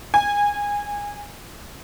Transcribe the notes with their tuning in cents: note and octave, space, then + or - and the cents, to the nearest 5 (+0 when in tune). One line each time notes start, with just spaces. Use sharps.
G#5 -20